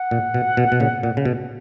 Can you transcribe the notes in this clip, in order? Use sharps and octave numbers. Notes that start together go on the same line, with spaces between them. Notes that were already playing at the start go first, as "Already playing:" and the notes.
Already playing: F#5
A#2
B2
B2
B2
A#2 C#3
A#2
C#3
B2